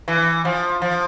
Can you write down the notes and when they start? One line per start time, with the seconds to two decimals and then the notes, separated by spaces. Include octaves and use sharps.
0.08 E3
0.45 F3
0.82 F3